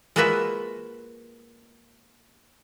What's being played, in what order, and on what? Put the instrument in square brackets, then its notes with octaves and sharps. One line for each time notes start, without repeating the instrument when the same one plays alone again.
[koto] G#3 A#3 F4 F#4 B4 E5